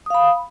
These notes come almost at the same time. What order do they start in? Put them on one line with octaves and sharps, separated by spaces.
D#6 F5 B5